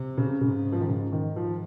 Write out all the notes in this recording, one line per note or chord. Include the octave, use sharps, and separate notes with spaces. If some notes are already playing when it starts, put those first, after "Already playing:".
Already playing: C3
C#3
G#2 C#3
F3
D#3
C#3
D#3
G#2 F3